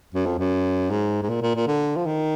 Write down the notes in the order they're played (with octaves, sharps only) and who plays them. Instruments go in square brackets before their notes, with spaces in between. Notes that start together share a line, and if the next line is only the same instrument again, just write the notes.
[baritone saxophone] F#2
F2
F#2
G#2
G#2
A#2
A#2
A#2
D3
F3
D#3